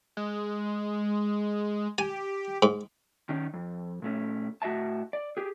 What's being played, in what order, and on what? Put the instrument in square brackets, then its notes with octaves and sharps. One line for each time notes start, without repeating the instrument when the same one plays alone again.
[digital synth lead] G#3
[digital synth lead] G4 [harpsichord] G#5
[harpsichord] G#2
[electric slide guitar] D#3 C#4 D#4
F2
A#2 A3 C#4
A2 F#4 D#5 E5 A5
D5
G4 G#4